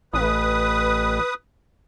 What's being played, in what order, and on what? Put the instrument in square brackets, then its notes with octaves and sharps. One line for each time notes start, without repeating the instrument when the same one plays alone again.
[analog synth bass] A1 [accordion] B4 D#6